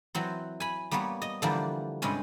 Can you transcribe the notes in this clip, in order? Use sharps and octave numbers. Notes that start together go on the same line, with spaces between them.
E3 F#3 C4
G#5 B5
G3 A#3 B3 B4 C#5
D#5
D3 E3 F3 G3 A#3 D4
G2 C3 G3 G#3 C#4 G#5